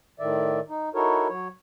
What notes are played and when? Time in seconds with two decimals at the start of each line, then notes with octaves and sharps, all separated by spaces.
0.20 A2 D#3 D5 E5
0.69 D#4
0.95 D#4 E4 F#4 A4 A#4 C#5
1.29 F#3 C#5